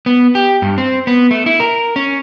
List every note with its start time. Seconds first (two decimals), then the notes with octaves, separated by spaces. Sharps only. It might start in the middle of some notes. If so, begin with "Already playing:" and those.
0.06 B3
0.35 G4
0.62 G2
0.78 C4
1.07 B3
1.31 A3
1.46 E4
1.60 A#4
1.96 C#4